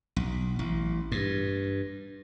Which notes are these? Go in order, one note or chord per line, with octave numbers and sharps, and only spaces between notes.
B1
A1
G2